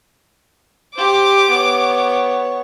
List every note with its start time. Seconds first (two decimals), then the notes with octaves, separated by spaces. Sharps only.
0.96 G4 C5 D6
1.49 B3 C#5